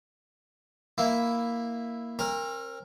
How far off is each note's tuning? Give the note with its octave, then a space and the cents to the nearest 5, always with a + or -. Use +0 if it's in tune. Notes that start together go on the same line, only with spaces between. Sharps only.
A#3 +0 E4 +0
C4 +45 A#4 +0